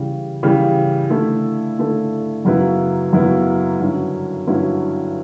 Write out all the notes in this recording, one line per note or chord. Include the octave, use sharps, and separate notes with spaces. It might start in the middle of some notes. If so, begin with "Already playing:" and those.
Already playing: C#3 E3 G3
C#3 E3 G3
D3 A3 E4 A4
D3 A3 E4 A4
F#2 C#3 F#3 B3 E4
F#2 C#3 F#3 B3 E4
G2 D3 F#3 C#4 E4
G2 D3 F#3 C#4 E4